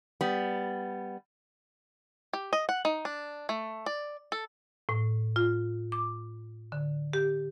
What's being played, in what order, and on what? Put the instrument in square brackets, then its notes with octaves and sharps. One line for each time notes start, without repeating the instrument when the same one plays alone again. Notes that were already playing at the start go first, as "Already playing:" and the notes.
[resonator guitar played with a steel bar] G3 B3
[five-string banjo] G4
D#5
F#5
D#4
D4
A3
D5
A4
[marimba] A2
F4
D6
D3
G4